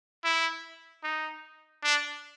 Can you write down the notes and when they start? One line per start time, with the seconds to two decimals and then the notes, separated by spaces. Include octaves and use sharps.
0.24 E4
1.04 D#4
1.83 D4